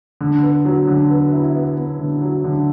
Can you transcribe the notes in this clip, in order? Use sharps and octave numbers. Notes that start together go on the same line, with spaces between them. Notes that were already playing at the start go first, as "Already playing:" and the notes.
D3
B3
F#3
D3
B3
E4
B3
B3
D3
F#3
D3